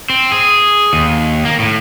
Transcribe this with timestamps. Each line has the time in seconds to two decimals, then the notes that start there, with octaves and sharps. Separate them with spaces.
0.10 C4
0.32 G#4
0.93 D#2
1.45 A#3
1.59 A2